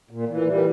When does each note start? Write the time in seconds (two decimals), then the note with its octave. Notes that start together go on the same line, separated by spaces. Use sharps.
0.11 A#2
0.29 A#2 E3
0.47 A#2 G3